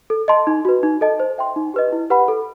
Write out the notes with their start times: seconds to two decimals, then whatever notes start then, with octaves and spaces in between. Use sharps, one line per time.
0.10 A4
0.28 D#5 A5 C6
0.47 D#4
0.65 F#4 B4
0.83 D#4
1.01 A4 D#5 A5
1.20 C5
1.38 E5 G5 C6
1.56 D#4
1.74 G4 B4 D#5
1.92 E4
2.10 G4 B4 F#5 B5
2.28 A4